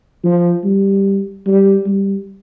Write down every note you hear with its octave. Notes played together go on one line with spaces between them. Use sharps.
F3
G3
G3
G3